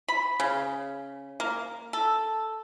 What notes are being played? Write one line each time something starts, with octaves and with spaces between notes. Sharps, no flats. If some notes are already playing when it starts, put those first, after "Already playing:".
B5
C#3
A#3
A4